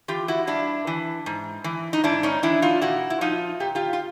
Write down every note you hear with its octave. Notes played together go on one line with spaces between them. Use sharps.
E3 F4 G4
E4 F#4
G2 D4 E4
E3
G#2
E3
D#4
G#2 D4 E4
C#4 D#4
E3 D4 E4
D#4 F4
A#2 E4 F#4
E4
F3 D#4 F4
A#2 G4
F4 G4
F4